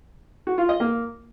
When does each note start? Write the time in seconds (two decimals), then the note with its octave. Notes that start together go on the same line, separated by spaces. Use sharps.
0.47 F#4
0.58 F4
0.69 D#5
0.80 A#3